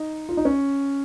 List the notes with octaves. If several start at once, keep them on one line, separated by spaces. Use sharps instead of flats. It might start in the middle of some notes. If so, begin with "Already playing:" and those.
Already playing: D#4
F4
D#4
C#4